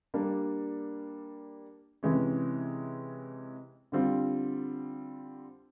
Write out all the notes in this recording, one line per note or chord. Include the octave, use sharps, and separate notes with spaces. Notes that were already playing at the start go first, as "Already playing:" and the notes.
G3 A#3 D4
C3 E3 G#3 C#4
D3 G3 C4 F4